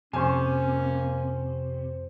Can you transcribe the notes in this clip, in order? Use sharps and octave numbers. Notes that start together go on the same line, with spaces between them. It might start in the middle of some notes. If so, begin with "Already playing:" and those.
F2 C3 A#3 C#4 C5 G#5 C#6